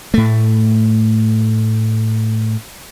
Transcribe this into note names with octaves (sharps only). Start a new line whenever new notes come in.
A2 A3